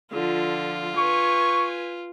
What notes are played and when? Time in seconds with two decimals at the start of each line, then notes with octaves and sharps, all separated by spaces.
0.12 D3 F3 F4
0.97 B4 G#5 C#6